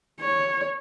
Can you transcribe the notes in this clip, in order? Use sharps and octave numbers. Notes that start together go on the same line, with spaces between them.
C#5